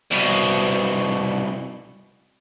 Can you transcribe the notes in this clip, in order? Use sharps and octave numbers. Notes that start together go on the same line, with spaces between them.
C2 B2